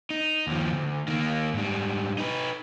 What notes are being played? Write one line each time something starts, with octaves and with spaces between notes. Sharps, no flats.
D#4
D#2 F3
D2
D#3 A#3
G#2 G3
D#4 B4